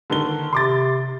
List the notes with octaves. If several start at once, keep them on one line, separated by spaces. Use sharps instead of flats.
D3 D#3 G7
C3 C6 D6 A6